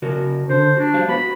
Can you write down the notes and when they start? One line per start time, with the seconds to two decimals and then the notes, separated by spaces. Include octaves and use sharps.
0.02 C#3 F#4 A#4
0.50 D3 C5
0.77 D4 F#4
0.94 G3 C5 F5
1.09 B3 F#4 B5